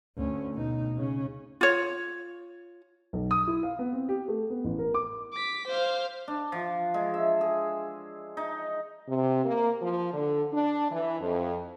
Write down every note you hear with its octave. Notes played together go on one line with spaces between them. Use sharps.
D2 C#4
B2 D#4
C#3 C#4
F4 C#5
B1
D#6
E4
F5
B3
C4
G4
A3
B3
A1
A#4
D6
D6 B6
C5 F5
D4
F3
G#3
E5
G#4
D#4
C3
A#3
F3
D3
D4
E3
F2